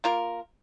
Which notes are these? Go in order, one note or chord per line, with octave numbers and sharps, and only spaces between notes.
A#3 F4 A#4